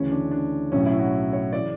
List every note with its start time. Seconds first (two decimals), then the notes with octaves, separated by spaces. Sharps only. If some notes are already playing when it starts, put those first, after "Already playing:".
Already playing: D2 C#3 E3 C#4
0.12 D4
0.31 D4
0.72 B1 A2 F#3 C#4
0.86 E4
0.99 F#4
1.33 C#5
1.53 C#3 E3 D5